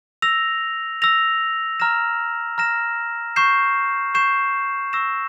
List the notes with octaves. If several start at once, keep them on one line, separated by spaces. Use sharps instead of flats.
E6 A#6 F7
E6 A#6 F7
A#5 F6 A#6 E7
A#5 F6 A#6 E7
C#6 G6 C7 E7
C#6 G6 C7 E7
C#6 E6 A#6 E7